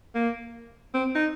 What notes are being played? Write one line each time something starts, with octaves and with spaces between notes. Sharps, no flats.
A#3
C4
D#4